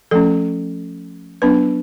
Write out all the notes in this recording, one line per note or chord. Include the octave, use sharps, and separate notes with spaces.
F3 A3 C#4 A4
F#3 B3 D4 B4